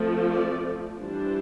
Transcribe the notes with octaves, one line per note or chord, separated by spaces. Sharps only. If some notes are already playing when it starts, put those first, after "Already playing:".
Already playing: F3 A3 C4
D5
E3 G3 D4 C5